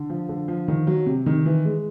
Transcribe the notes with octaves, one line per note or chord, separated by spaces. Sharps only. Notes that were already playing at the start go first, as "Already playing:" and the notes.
Already playing: D3
F3
D3
F3
D#3
F#3
C3
D#3
E3
G#3